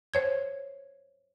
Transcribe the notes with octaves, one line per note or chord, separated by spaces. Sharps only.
C5 C#5 G#6